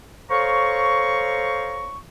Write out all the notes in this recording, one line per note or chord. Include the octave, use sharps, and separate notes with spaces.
A4 C5 C#5 F5 A#5 C#6